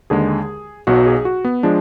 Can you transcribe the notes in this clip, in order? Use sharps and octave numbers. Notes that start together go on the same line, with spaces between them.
D#2 D3 G#3 G#4
B1 B2 F#3 F#4
G#4
F#4
B3
F3 G#3 D4